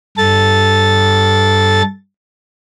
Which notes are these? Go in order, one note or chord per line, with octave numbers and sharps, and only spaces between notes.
G2 A4 A6